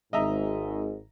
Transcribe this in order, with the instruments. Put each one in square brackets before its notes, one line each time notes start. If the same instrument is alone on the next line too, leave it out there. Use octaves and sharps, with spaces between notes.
[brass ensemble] G#1 [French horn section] G#2 [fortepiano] D#5 E5 A#5